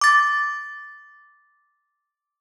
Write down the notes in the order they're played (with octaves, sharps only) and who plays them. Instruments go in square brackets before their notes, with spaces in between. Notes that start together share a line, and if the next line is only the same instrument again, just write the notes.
[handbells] D6 A6